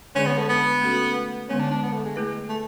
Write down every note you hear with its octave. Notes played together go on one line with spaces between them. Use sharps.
D3 G#3 C#4 D4 G#4 D5
B3
A3
B3
A3 C#4 F#4 A4
D3 G#3 B3 C#4
D4
D4
B3
A3
G#3
A3 E4 G#4 B4
A3